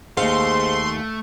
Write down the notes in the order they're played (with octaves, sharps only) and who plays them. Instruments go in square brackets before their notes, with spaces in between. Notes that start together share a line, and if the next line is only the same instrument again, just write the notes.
[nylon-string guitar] D#2 F5 [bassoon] G#2 [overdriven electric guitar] A3 [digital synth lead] C6